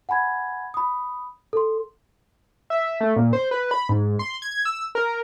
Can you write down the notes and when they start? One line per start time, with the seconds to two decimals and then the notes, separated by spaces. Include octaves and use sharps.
0.09 F#5 G#5 B5 G#6
0.74 B5 D#6
1.53 A4 C6
2.70 E5
3.01 A3
3.16 A#2
3.33 C5
3.51 B4
3.71 B5
3.89 G#2
4.19 C6
4.42 G#6
4.65 E6
4.95 A#4